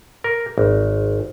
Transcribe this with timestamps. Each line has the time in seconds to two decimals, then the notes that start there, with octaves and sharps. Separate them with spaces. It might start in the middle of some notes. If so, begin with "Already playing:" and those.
0.24 A#4
0.58 G#1